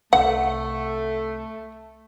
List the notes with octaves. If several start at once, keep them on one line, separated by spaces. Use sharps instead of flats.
C2 C3 A3 F#5